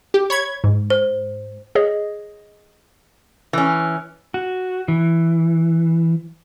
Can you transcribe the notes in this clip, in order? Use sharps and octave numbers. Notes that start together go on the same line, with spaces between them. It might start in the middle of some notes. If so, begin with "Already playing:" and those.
G4
C#5 B5 G#6
G#2
C5
G#4 C#5 D#5
E3 C#4
F#4
E3